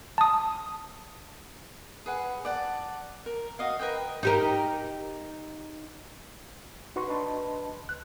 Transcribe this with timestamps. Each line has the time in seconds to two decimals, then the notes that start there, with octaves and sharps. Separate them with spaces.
0.18 A5 D#6
2.06 G#4 B4 F#5
2.45 D5 F#5 A5
3.26 A#4
3.59 F#4 D#5 F5
3.79 A#4 B4 D#5 G5
4.23 D#4 G4 A#4
6.96 D#4 F#4 B4 C6 C#6
7.07 D4 B4 D#5 A5 C6
7.85 D2 F#6